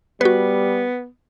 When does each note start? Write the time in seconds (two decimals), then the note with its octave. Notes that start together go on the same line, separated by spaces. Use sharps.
0.21 G3 B3 F#4 B4